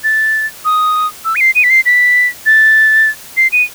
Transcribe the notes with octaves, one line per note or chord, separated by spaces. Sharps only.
A6
D#6
E6
D#7
C7
D#7
B6
C7
B6
A6
C7
D#7